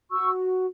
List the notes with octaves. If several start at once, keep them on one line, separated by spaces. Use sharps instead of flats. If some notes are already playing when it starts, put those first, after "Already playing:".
F#4 C#6 E6